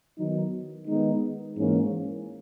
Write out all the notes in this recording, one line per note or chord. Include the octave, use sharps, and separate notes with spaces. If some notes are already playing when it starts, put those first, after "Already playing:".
D#3 F#3 B3 D#4
D#3 G#3 B3 D#4
G#2 E3 A#3 C#4